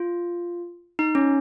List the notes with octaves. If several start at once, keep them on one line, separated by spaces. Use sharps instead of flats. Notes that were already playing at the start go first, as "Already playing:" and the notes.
Already playing: F4
D#4
C#4